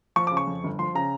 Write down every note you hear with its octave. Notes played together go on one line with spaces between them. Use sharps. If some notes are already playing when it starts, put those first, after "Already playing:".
F3 C#6
D6
C#3
C#6
F2
G1
F3 C6
C#3 A#5